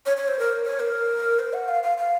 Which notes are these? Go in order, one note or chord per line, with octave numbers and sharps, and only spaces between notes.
C#5
C#5
C5
A#4
C#5
A#4
C5
F#5
F5
F5
F5